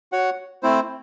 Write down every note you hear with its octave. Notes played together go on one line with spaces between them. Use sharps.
F#4 C#5 F#5
A3 C4 E4 C5